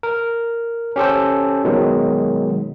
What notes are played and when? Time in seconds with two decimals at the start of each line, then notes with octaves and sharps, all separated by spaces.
0.03 A#4
0.96 C#4 G4 A4 C5
1.65 B2 D#3 F#3 G#3